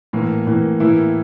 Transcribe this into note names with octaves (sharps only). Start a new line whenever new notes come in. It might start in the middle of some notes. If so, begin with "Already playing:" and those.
A2 E3 A#3
A2 E3 A#3
A2 E3 A#3 E4